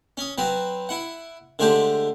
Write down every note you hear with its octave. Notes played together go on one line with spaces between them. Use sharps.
C#4 D#6
F#3 C4 B4
E4 F#5
D3 G#3 A3 G4 C5